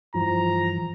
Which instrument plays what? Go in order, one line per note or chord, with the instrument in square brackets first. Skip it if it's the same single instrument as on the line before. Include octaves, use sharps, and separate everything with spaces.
[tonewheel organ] G2 E3 [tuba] F3 [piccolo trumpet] A#5